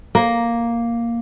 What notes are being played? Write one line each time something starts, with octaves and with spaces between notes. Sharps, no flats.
A#3